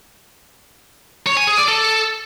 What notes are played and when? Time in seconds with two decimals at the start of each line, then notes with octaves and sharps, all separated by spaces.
1.27 C#5
1.37 G#5
1.47 G#4
1.58 D5
1.68 A4